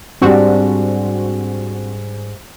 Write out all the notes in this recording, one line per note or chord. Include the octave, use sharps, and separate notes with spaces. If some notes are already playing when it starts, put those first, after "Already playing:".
G#2 G3 C4 D4 F#4